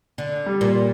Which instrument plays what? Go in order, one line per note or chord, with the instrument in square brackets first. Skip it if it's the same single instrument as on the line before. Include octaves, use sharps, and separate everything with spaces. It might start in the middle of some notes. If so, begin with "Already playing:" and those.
[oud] D3
[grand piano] G3
[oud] A#2
[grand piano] A#3